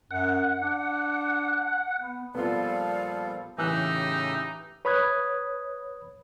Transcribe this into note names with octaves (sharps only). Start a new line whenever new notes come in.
F#2 F#5
D4
B3
A#2 F3 G3 B3 F4 A4 D5 F5
A2 C#3 E3 D#4 G4 E5 E6 F#6
B4 C#5 B5 D#6 F#6 G#6